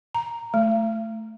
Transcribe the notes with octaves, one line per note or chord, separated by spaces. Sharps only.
A#5
A3